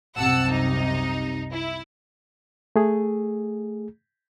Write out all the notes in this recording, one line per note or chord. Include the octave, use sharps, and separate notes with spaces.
C2 F#2 C3 F#5 A5 E6
D#4
E4
A3 G#4